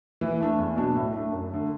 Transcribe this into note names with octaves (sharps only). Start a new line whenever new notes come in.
E3
A3 D4
E2
B2 F#3 D4
A2
A3 D4
F#2
D3 A3